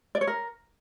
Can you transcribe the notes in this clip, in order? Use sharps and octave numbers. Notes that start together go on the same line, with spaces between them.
D5
C#5
A#4